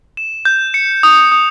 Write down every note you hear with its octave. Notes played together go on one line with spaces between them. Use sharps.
E7
G6
C#7
D#6
D#6